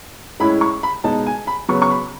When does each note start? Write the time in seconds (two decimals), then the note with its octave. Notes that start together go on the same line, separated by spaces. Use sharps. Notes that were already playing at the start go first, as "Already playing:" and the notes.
0.40 A2 G#3 C#4 E4 B5
0.61 C#6
0.83 B5
1.04 B2 G#3 D#4 A5
1.26 G#5
1.47 B5
1.68 C#3 F#3 B3 C#6
1.82 C#6
1.91 B5